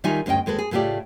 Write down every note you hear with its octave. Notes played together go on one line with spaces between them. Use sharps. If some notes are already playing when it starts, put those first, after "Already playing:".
D#3 G3 D#4 F4 E5 G#5
D2 G2 C#4 D#5 G5
D#2 G#3 A4 B4
G#4
A2 C#3 A3 F4 G4 D5